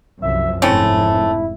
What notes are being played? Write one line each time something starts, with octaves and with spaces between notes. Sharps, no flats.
C2 F#2 F3 E5
F1 G#2 A3 C4 C#4 E4